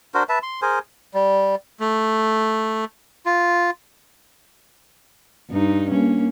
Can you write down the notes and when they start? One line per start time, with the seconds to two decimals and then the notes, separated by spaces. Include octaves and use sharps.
0.14 D4 F#4 A#4 C5
0.29 B4 E5 A5
0.43 C6
0.62 G#4 A#4 C5 G#5
1.14 G3
1.80 A3
3.26 F4
5.50 G2 D#4
5.90 A#3 C#4